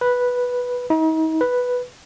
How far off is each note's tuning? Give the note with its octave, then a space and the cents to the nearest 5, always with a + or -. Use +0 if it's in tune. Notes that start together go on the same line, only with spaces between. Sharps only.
B4 -5
D#4 +40
B4 +0